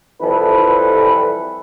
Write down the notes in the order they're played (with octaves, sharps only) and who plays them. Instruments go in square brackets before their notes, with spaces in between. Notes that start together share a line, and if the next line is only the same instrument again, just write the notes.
[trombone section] C2 F2 E3 G3 A4 B4